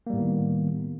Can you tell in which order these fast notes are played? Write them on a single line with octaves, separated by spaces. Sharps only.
A#3 G3 A2 B3 D#3